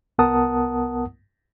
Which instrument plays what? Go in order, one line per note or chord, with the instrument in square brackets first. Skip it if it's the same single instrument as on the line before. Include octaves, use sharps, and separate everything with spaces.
[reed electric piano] C2 B3 A#4 F#5 A5 D#6